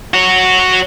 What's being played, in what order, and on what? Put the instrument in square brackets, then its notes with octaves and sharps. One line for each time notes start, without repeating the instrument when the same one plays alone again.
[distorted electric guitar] F#4 C#5